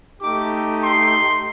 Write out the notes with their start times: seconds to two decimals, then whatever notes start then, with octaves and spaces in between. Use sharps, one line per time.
0.22 A3 D#4 G4 D6
0.82 C6